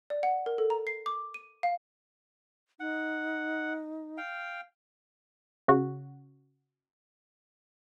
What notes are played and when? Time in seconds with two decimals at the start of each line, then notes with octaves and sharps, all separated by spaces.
0.10 D5
0.23 F#5
0.46 A#4
0.58 A4
0.70 A#5
0.87 C7
1.06 D6
1.34 D#7
1.63 F5
2.80 D#4 F#5
4.18 F5 G5
5.68 C#3 F#4